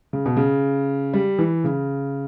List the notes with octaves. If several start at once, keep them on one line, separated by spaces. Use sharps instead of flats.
C#3
B2
C#3
G3
E3
C#3